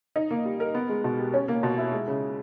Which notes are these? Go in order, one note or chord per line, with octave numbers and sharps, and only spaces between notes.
D#4
A#3
G3
A#4
B3
G#3
B2
G4
C#4
A#3
B2
E4
G#3
C#3